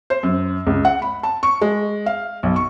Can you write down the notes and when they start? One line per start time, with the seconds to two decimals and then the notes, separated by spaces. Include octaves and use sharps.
0.10 C5
0.23 F#2
0.66 C#2
0.85 F#5
1.02 B5
1.23 A5
1.43 C#6
1.61 G#3
2.06 F5
2.43 B1
2.56 C#6